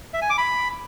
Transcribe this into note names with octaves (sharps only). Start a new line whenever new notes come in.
E5
G#5
D6
B5